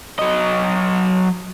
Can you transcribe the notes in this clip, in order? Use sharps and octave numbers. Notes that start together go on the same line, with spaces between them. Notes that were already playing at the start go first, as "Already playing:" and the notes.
F#3 D#5